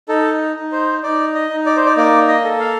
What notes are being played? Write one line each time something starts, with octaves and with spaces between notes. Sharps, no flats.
D#4 A4
D#4
C5
D#4 D5
D#5
D#4
D5
C5
D5
A#3 D5
D#5
A4
F5